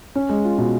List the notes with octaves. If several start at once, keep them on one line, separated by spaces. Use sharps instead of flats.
C#4
G#3
F4
B2